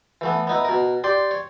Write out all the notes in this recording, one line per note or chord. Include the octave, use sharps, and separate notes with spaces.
E3 A3 B3
B3 D#4 E4
B2 A#4
G4 D5 C6
C#5